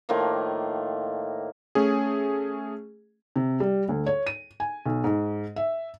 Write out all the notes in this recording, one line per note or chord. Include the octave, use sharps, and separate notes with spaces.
A2 D#3 F3 A#3
A3 C#4 G#4
C3
G3
D2
C#5
D#7
G#5
B1
G#2
E5